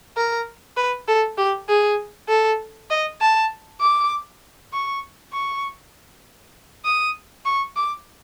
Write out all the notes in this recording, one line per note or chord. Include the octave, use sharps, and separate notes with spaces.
A#4
B4
A4
G4
G#4
A4
D#5
A5
D6
C#6
C#6
D#6
C#6
D6